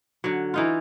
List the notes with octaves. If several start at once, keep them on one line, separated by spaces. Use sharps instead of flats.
D3 F#3
E3 D#4 F4